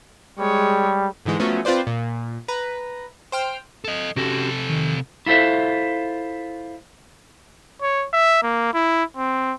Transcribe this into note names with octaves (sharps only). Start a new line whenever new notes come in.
G3 G#3 C#5
G#2 D3 E3 G#3
F3 F#3 A3 B3 C#4
C4 F4 B4 C5 D5
A#2
B4 A#5
C5 G5 F6
A4 D#5
C3 C#4 F#4 G4 A4
D#3
E4 F4 A4 C5 E5
C#5
E5
A#3
E4
C4